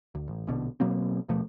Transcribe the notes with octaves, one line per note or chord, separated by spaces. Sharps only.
D2
A1
A#1 B2 D3
B2 F#3 A#3 C4
D#1 B2 F3 A3